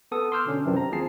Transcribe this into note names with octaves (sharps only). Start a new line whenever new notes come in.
B3 A4 D#6
C6 D6 E6 F6 G6
B2 D3 C#4 D4
F#2 C3 E3 F3 C4 D4
A#5
D#2 C4 F4 G#4 A5 C7